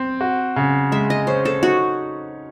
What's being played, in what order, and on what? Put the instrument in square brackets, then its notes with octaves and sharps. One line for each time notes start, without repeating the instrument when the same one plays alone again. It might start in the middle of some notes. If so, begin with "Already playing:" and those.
Already playing: [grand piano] C4
F#4
C#3
[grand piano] G#3 [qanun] E5
[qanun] D#5
[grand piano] C#4 [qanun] C5
[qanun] A4
[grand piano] D#4 [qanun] F#4